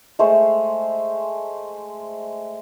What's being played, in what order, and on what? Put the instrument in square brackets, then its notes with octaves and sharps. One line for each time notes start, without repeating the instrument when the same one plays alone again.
[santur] G#3 A3 C5